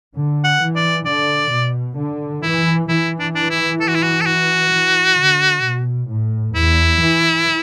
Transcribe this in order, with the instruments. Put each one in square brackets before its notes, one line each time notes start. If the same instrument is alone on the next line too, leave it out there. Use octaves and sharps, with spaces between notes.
[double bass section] D3
[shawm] F#5
[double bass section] E3
[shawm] D5
[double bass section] D3 [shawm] D5
[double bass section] B2
D3
[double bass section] E3 [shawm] E4
[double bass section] E3 [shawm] E4
[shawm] D4
D4
E4
A4
F#4
E4
F#4
A4
F#4
[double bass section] E3
D3
B2
A2
[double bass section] E2 [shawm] E4
[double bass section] E3